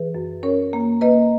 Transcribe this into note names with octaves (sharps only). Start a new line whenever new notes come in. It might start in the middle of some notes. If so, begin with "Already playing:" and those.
Already playing: E3 G#4 B4
F#2
C#4 A#4 C#5
A#3
A#3 B4 D#5